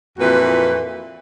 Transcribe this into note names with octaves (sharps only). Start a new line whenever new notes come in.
F2 A#2 E3 F#4 B4